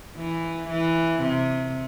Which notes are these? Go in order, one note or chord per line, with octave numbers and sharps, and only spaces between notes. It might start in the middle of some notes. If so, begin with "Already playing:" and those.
E3
E3
C3